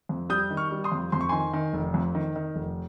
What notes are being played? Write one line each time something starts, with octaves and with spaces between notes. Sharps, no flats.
F2
G3 D#6 G6
D#3
C#6 F6
G3
C6 D#6
F2
F2 C6
C#6
D#3 G#5 C6
D#3
F1
F2
D#3
D#3
F1